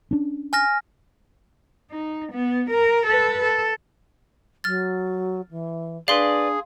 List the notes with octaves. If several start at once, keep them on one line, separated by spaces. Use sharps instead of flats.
C#4 D4
G#5 F6 A#6
D#4
B3
A#4
A4 B4
A4
F#3 F6 A6
E3
D4 G#4 B4 D5 F5 C6